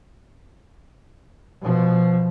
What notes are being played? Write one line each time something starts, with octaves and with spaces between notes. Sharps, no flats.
B2 F3